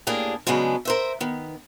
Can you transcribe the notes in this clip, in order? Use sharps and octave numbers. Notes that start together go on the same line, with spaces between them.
A2 A#3 D4 G4 G#4 D5
C#3 F#3 G#3 B3 D4
A#4 C5 E5
D#3 B3